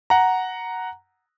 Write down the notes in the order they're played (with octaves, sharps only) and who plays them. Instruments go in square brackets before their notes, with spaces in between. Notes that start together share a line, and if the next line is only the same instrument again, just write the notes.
[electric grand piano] F#5 A#5